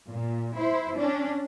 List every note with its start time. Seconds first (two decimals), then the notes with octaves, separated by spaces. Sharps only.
0.10 A#2
0.57 E4 C5
0.97 C#4 D4